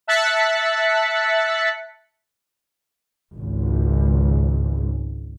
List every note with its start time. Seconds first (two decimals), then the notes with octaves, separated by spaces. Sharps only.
0.07 E5 A5 F#6 A6 B6 C#7
3.36 G#1 C#2